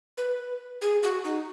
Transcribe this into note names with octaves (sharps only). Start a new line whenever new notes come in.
B4
G#4
F#4
D#4